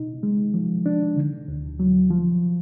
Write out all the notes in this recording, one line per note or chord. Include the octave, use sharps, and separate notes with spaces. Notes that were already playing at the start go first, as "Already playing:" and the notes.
Already playing: B2 D#4
G#3
F3
D4
D3
D2
F#3
F3